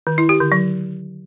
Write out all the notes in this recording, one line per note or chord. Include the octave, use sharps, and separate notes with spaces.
D#3
E4
G4
D3
F#3